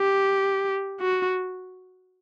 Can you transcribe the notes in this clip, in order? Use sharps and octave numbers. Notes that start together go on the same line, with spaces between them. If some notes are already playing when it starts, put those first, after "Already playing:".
Already playing: G4
F#4